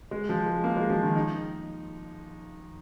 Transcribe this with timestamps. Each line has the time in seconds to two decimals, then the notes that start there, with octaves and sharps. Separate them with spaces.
0.11 G#3
0.29 F3
0.46 G#3
0.64 A#3
0.77 G#3
0.90 F3
1.03 D#3
1.16 D#4